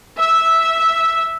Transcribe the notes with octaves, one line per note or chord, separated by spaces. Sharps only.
E5